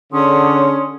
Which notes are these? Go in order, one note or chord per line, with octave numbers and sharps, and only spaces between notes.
D3 C#4 G#4 C6 D#6